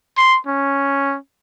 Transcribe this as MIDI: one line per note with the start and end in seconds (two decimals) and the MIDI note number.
0.17 0.38 84
0.47 1.17 61